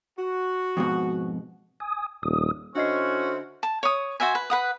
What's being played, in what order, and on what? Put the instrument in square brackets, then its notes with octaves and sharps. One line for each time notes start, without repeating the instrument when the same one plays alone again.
[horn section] F#4
[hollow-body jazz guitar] F2 G#2 B2
[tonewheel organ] G#5 D#6
[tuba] D#1 [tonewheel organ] D#6
[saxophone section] D3 E4 F#4 [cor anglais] C#4 [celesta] D4 D#5 C7 [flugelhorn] C5
[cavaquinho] A5
C#5 D#6
F#4 C5 E5 G#5
B4
B4 F#5 D#6